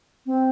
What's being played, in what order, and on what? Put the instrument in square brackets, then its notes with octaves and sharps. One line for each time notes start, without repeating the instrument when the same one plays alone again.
[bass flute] C4